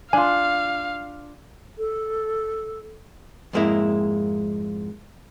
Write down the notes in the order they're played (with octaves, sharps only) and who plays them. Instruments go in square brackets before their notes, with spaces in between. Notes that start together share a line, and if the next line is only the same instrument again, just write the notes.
[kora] D4 F4 [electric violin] F5 [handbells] G#5
[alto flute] A4
[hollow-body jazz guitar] F2 G#2 G#3 A#3 E4